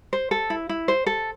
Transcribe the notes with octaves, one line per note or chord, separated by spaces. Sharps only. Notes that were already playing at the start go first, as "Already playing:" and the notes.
C5
A4
E4
E4
C5
A4